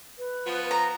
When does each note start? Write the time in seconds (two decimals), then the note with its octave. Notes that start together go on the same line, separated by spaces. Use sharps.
0.18 B4
0.47 F3 B3
0.71 A#5